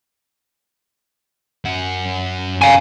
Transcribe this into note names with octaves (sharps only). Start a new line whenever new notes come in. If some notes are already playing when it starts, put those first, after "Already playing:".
F#2 F#5
F5 G#5